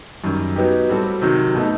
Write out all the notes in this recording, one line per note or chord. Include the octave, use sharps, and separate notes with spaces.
F#2 D#3 G3
F#3 B3 D#4 G4
A2 G3 C4 F#4 A4
C3 D#3 F#3
B2 A3 D#4